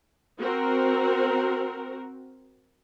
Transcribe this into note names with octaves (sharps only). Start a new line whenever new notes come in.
C4 F#4 A#4